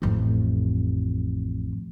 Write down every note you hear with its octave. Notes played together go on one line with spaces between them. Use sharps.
A1 F2